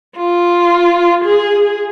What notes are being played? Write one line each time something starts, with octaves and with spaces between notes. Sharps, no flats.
F4
G#4